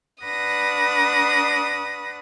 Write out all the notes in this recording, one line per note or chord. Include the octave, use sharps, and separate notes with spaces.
D4 B4 F#5 D#6 A#6